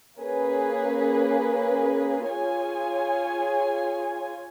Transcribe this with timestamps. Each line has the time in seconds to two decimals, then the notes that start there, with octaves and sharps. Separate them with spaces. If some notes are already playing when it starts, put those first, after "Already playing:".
0.19 A#3 C#4 G#4 B4
2.27 F4 G#4 C#5 G#5